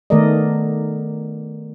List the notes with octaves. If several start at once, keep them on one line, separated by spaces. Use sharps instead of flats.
D#3 A3 B3 A#4 D5 D#5